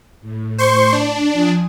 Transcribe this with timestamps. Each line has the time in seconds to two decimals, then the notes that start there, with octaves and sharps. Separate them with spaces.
0.21 A2
0.58 C5 C6 C#6
0.93 D4
1.32 F3 G#5 D#6